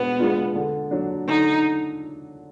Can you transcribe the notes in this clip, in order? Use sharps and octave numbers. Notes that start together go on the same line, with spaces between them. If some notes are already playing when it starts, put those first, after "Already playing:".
Already playing: B2 G#3 B3 D4
G#3 D4 F4
D3
F#3 D4
D3 D#4